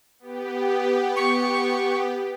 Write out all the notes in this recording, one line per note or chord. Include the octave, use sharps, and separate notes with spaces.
B3 G4
C#6